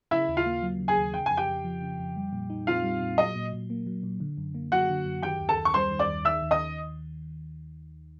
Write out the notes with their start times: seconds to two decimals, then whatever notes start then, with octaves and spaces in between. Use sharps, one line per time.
0.11 C#3 E4 E5
0.28 D#2
0.37 F4 F5
0.46 A#3
0.62 F#3
0.79 C#3
0.88 G#4 G#5
0.97 D#2
1.14 C#3 G5
1.26 F2 G#5
1.37 G4 G5
1.48 F2
1.64 F3
1.82 C#3
2.00 F2
2.16 G3
2.33 A#2
2.50 D#4
2.67 C4 F4 F5
2.84 G3
3.01 A#2
3.18 F#3 D#5
3.35 A#2
3.53 A#2
3.70 A#3
3.86 F#3
4.03 A#2
4.20 D3
4.37 F#2
4.55 A#3
4.72 F#3 F#4 F#5
4.89 D3
5.06 F#2
5.23 D#3 G4 G5
5.40 D#2
5.49 A4 A5
5.57 D#2
5.65 C#6
5.74 G3 C5 C6
5.91 D#3
5.99 D5 D6
6.08 D#2
6.25 D#3 E5 E6
6.42 D#2
6.51 D#5 D#6